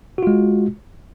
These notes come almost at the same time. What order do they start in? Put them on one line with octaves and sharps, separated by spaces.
F#4 F4 G#3